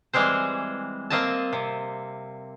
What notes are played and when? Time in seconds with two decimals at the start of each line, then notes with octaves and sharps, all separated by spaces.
0.13 E3 G3 G#3 C4 C5
1.10 A#3 C4 D#5 E5 A5
1.53 C3